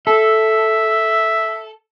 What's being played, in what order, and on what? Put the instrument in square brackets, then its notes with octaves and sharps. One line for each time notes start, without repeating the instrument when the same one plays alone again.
[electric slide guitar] A4 [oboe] E5